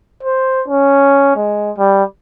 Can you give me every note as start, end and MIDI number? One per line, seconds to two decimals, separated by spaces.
0.23 0.63 72
0.68 1.35 61
1.36 1.71 56
1.78 2.03 55